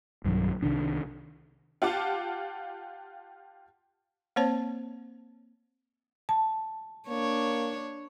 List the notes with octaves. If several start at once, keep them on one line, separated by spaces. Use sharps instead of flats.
B1 G2 D#3 F#3
C2 C3 D#3 D4
F4 G4 F5 F#5 A5 D6
A#3 C4 C5 C#5 A5
A5
A#3 D4 C#5